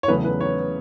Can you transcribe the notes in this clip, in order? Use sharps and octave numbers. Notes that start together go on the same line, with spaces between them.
C#5
E2 C#3 F#3 A3 C#4 B4
B4
C#5